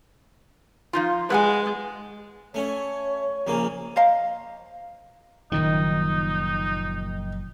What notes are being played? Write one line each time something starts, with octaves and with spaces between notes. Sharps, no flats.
F3 D#4 F4
G#3 B4 F#5 G#5
A3 C#4 C#5
A#1 C#3 A#3
C5 D#5 F5 A#5
F#1 A#2 D#3 F3 D#4